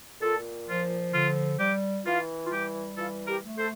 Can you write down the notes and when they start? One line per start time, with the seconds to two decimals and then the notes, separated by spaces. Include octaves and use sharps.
0.21 A#2 F4 A4
0.67 F3 F4
1.13 D3 F4
1.59 G3 G4
2.05 E3 F4
2.46 F4
2.51 G3 G4
2.96 E3 F4 A4
3.27 G4 A#4
3.42 A3
3.58 A4 C5